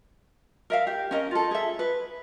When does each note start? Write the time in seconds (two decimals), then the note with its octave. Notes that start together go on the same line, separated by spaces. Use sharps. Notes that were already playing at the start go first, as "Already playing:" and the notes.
0.70 A#4 E5 F5
0.87 G4
1.11 C#4 A#4 D#5
1.31 F4 A4
1.51 G#4 E5
1.79 B4